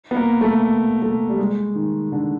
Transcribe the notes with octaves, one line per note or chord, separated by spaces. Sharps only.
B3
A#3
A3
A3
G3
G#3
D#3
D3